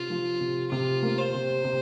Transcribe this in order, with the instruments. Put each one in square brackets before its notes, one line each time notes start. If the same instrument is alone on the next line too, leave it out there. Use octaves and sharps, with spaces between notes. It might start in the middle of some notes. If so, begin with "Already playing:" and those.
Already playing: [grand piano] C3 [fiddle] F4
[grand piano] F3
C3
[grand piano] C3 [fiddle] F4
[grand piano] A#3
[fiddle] C5
[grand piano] C3
C3